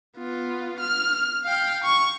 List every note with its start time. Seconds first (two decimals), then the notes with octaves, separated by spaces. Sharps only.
0.17 B3 F4
0.80 F6
1.44 F5 G5
1.84 C#6